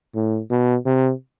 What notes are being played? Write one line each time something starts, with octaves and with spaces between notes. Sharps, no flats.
A2
B2
C3